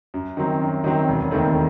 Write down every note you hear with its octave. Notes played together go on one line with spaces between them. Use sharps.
F#2
D#3 F#3 C4
F#2
D#3 F#3 C4
E1
D#2 D#3 A3 C4